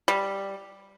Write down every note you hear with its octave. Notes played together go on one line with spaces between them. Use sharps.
G3